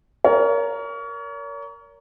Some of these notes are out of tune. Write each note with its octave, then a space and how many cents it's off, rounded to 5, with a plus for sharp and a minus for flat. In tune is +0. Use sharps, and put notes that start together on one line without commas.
A#4 +0 C#5 +35